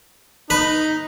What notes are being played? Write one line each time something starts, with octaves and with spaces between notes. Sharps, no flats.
D#4 B4